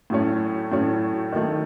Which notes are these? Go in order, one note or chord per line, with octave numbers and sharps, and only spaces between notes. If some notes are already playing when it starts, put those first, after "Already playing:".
A2 F#3 A3 C#4
A2 F#3 A3 C#4
D#3 F#3 A3